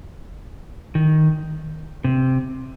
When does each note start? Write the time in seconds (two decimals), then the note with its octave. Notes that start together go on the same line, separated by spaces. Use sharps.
0.95 D#3
2.04 C3